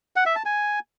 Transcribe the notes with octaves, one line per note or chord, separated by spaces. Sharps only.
F#5
E5
A5
G#5